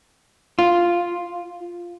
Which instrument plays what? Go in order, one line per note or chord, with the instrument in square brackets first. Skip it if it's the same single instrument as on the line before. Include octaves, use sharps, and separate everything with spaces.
[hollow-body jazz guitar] F4